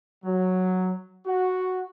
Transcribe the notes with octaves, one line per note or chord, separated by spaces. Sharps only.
F#3
F#4